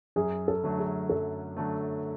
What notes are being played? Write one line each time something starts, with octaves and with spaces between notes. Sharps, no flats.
F#2 G#4
A4
D3 F#3 A3
G#4
F#2 A4
D3 F#3 A3